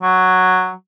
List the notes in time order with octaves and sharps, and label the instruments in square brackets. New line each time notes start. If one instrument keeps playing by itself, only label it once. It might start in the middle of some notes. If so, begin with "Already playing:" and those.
[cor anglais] F#3